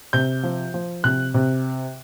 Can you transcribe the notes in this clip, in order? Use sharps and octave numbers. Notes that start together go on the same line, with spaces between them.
C3 G6
F3
F3
C3 F#6
C3